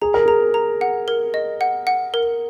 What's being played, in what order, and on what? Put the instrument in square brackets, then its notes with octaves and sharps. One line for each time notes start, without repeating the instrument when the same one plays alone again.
[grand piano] G#4 [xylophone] A#5
[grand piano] A#4
[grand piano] G#4 [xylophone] A#5
[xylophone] A#5
F#5
A#4
D#5
F#5
F#5
A#4